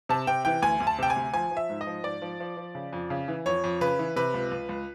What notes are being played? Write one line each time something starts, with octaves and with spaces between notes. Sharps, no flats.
C3 A5
C3 G5
E3 G5
D2 G#5
D2
A5
C3 G5
G#5
D2
F3 G#5
F3
E5
G#2
D#5
F3
G#2 D5
F3
F3
F3
C#3
F2
C#3
E3
F2 C#5
F2
C#3 B4
E3
C3 B4
C#2
C#2
C#2